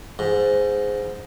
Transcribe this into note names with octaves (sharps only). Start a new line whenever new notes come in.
G#2